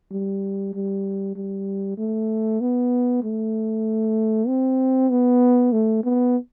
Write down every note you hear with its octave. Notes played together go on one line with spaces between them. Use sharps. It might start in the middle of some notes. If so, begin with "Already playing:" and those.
G3
G3
G3
A3
B3
A3
C4
B3
A3
B3